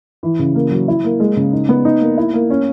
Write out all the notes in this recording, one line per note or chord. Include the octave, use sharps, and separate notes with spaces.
E3
C#3
A#3
F#3
E4
A#3
G#3
C#3
D#4
B3
D#4
A#3
E4
A#3
C#4